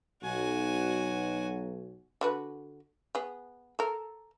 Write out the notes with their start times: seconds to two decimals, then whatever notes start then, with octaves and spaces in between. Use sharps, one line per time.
0.23 B1 B2 F#4 G#5
2.21 D3 F#4 B4
3.15 B3 G#4
3.79 A4 A#4